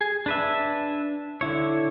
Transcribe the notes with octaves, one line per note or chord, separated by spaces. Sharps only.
G#4
D4 B4 E5
D3 E4 C#5